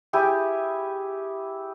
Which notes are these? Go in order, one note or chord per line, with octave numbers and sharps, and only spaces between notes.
E4 G4 G#4